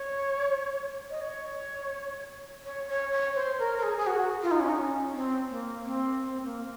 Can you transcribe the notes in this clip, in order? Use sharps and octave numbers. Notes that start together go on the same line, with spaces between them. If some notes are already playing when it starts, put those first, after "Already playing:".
Already playing: C#5
D#5
C#5
C#5
C#5
C#5
C5
A#4
A#4
G#4
G#4
F#4
F4
D#4
C#4
D#4
C#4
C4
A#3
C4
C4
A#3